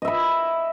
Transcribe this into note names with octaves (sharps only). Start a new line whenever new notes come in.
D#5 E5 B5